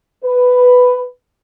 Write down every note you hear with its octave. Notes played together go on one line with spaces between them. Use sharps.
B4